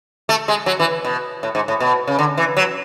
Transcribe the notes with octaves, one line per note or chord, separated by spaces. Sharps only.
A3
G#3
F#3
E3
B2
A2
G#2
A2
B2
C#3
D3
E3
F#3